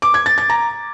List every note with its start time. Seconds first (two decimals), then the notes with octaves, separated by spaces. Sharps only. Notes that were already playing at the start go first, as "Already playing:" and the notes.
0.02 D6
0.14 G#6
0.26 A6
0.38 A6
0.50 A#5